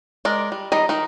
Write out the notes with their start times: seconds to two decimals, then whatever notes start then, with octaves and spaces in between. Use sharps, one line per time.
0.25 G#3 A#4 D5
0.52 G3
0.72 D#3 G3 D#4 D#5
0.89 D#3 D#4